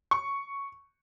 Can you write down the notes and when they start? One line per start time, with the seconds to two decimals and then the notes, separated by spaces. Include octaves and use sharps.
0.11 C#6